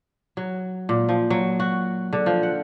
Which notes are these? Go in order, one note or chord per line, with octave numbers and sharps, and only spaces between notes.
F#3
A#2
F3
F#3
F#4
D3
F3
F#5